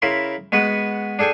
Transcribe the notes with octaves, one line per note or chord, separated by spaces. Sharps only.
C#3 E4 A#4 B5 C6
G#3 B3 F#4 B4
D4 G#4 A4 G5 G#5